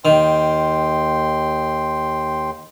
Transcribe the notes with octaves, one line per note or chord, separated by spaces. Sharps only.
D#2 D#3 G5 C6